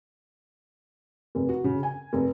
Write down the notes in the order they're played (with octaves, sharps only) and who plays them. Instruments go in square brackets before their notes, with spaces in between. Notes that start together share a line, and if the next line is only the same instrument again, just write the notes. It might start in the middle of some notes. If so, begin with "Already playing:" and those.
[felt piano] F1
F#4
C#3
G#5
F1